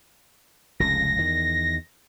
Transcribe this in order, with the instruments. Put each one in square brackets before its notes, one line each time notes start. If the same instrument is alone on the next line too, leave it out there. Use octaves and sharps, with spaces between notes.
[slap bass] F1 C#2 C#3 [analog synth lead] A#6
[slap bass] E2 D#3